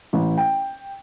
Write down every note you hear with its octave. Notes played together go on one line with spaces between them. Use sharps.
A1
G5